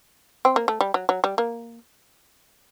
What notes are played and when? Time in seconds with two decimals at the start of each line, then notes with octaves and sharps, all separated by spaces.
0.45 C4
0.56 A#3
0.68 A3
0.81 G3
0.94 F#3
1.09 F#3
1.24 G3
1.38 A#3